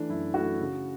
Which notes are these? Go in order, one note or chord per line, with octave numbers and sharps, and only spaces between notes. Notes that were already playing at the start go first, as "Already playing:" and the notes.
Already playing: E3 A3 D4
F#2 E4
E3 A3 F#4
C#3